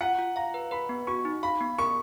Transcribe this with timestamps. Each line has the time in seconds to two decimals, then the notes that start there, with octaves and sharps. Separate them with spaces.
0.01 F4 F#5
0.18 F4
0.36 F5 A#5
0.54 B4
0.71 B4 B5
0.89 B3
1.07 F#4 C#6
1.25 D#4
1.43 F5 B5
1.60 B3
1.78 A#4 C#6